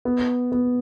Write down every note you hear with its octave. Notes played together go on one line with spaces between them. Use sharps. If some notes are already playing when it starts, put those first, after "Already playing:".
B3
B3